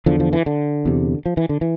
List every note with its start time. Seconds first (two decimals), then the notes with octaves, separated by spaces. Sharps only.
0.06 E2 D3 F3
0.20 F3
0.33 E3
0.46 D3
0.85 E2 C3
1.26 F3
1.37 E3
1.49 D3
1.61 E3